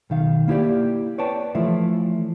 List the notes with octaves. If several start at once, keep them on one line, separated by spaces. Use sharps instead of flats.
B1 D#3 F5
A#3 E4 G4 D5
B4 C#5 D5 G5 A5
E3 F3 A3 E4